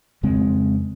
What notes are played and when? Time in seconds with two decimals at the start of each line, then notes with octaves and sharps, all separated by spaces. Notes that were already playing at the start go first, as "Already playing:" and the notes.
0.23 F2 C#3 G#3 C4